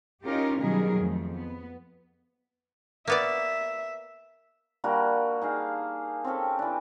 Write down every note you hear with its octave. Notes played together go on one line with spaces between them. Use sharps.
C#4 D#4 F4 G4 A#4
B2 D#3 F#3 G3 G#4 A#4
F2 A3
B3
A#3 B3 D5 E5
G3 A#3 D4 F#4
D#4 G#4 F5
C4 C#4 G4 A4
E3 D4